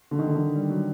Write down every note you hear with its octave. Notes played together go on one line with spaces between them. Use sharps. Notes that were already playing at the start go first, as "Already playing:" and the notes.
D3
D#3
D3
D#3
G3
F#3